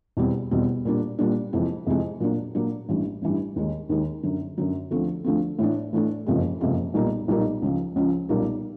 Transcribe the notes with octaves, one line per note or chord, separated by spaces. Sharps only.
E2 B2 G3 C4
E2 B2 G3 C4
A#2 G3 A#3 D4
A#2 G3 A#3 D4
F2 C3 E3 G#3 C4
F2 C3 E3 G#3 C4
A#2 F#3 A#3 D4
A#2 F#3 A#3 D4
A1 G2 E3 G3
A1 G2 E3 G3
D#2 D#3 G#3
D#2 D#3 G#3
F#2 D3 F#3
F#2 D3 F#3
D2 D3 F3 A3 C4
D2 D3 F3 A3 C4
A2 E3 A3 D4
A2 E3 A3 D4
F#1 F2 C3 F3 G#3
F#1 F2 C3 F3 G#3
B1 A#2 G3 A#3 D#4
B1 A#2 G3 A#3 D#4
C#2 C#3 F3
C#2 C#3 F3
B1 A#2 G3 A#3